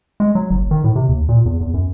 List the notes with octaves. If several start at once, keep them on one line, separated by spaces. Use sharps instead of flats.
G#3
F#3
F#1
D#3
A2
C3
D#2
A#2
E2
E2
F#2